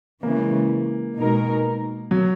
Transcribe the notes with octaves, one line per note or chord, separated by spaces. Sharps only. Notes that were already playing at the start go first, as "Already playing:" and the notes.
C#3 E3 G#3 A#3
B2 G#3 D#4 A#4
F#3